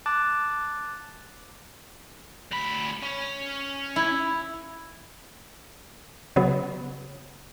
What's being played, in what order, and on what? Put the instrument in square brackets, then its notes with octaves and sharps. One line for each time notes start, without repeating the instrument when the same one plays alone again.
[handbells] A5 D6 F#6 A6
[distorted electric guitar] D2 B5
C#4
[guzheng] E4
[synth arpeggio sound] C#3 F#3 B3